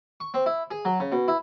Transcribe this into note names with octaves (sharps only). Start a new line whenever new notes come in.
C#6
C4
E4
G#4
F#3
C#3
B2
E4